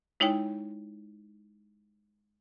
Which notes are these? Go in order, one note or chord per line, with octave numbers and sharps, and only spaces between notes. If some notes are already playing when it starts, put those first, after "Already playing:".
G#3 D#4 E4 C#5 G5